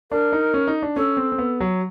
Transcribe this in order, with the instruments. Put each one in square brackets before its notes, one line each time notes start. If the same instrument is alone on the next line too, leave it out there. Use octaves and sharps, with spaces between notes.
[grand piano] D4 [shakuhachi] A#4
[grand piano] D#4
C#4
D#4
D4
[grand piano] C#4 [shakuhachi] A4
[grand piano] C4
C4
B3
F#3